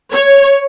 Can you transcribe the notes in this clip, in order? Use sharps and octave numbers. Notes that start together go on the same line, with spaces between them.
C#5